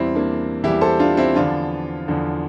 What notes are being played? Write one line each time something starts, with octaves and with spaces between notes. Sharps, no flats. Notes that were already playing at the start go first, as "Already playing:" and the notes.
Already playing: E2 E3 G3 C4 E4
A#3 D4
E2 E3 G3 E4 G4
A4 C5
D4 F4
C4 E4
E2 D3 F3 D4 F4
E2 D3 F3